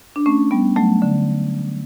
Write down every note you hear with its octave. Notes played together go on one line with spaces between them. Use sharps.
D4
A3 C#4
G3 B3
F#3 A3
D3